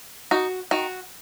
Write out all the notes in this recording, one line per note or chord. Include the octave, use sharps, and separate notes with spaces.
D#4 F#4
D#3 F#4